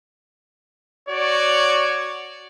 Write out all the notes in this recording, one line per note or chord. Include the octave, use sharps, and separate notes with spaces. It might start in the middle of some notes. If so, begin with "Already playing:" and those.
F#4 C#5 D5